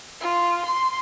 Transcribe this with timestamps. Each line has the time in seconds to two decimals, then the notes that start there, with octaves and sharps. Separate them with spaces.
0.21 F4
0.66 C6